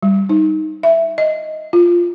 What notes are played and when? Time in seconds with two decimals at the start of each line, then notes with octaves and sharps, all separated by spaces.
0.03 G3
0.29 D#4
0.83 E5
1.18 D#5
1.73 F4